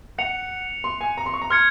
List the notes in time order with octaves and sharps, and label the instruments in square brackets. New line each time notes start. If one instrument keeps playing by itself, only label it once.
[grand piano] F#5 [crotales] F#6 C#7 F7
[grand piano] C6
G#5
A#5
C6
C#6
A#5
[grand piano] C6 [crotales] F6 G#6 C#7